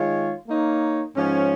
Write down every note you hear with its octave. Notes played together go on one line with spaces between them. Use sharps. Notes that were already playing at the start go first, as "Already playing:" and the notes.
Already playing: D#3 G#3 F4 C#5
A#3 D#4 C#5
G#2 F3 C#4